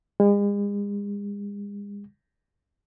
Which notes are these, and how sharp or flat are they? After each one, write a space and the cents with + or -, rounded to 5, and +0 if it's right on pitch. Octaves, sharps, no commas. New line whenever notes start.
G#3 -40